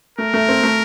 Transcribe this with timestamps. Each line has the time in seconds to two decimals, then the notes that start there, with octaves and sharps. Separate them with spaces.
0.18 A3 A#4
0.34 A3
0.49 C4
0.63 A3